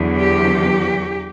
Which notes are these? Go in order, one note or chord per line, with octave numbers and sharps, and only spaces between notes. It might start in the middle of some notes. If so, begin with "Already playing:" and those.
Already playing: E2 D3 F#3
G4